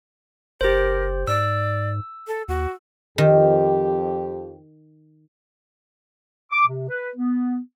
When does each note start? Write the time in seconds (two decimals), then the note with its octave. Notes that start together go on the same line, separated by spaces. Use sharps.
0.61 F#1 G4 A#4 C5
1.27 G#2 D5 E6
2.27 A4
2.48 D#2 F#4
3.18 F2 D#3 G4
6.51 D6
6.67 C3
6.89 B4
7.16 B3